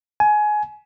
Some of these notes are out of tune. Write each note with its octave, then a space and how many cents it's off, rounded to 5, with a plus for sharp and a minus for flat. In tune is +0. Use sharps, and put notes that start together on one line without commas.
G#5 +20